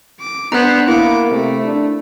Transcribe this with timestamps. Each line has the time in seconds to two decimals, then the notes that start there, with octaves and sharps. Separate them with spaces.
0.20 D6
0.52 B3 D4 C5 A#5 F#6
0.88 A#3 E4 D6
1.31 C3 A3
1.64 D4